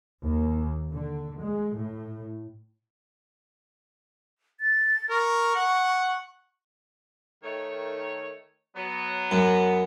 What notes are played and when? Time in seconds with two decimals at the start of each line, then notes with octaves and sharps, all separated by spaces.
0.23 D#2
0.92 D3
1.42 G#3
1.77 A2
4.60 A6
5.10 A#4 C#6
5.56 F#5
7.44 D#3 A3 C#5
8.76 F#3 B3
9.31 F#2